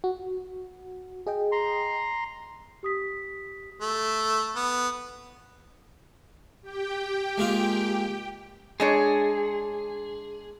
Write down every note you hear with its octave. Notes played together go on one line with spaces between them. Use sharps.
F#4
G#4 D#5 G5
A#5 C6
G4 D#6 B6
A3
B3
G4 G5
G#3 A#3 F4
G#3 D4 G#4 C#5